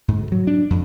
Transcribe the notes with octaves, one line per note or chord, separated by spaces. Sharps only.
G#2
D2
F#3
D4
F2